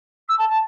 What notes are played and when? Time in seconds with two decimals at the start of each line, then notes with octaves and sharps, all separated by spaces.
0.28 E6
0.38 A5
0.48 A5